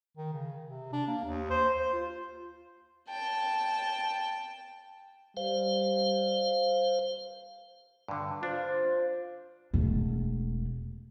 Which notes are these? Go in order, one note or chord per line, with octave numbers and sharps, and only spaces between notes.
D#3
C#3
C3
D4
A#3
D#2
C5
C5
F4
G5 A5
G3 C5 F5
G2 D3
D4 F4 C5
E1 A3